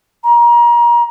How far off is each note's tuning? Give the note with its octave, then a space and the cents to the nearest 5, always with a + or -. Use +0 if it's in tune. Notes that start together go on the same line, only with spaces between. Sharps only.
A#5 +30